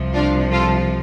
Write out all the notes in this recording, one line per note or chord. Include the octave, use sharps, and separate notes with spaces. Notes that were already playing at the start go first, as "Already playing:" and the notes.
Already playing: C2 C3 F3
D4 F4
F4 A4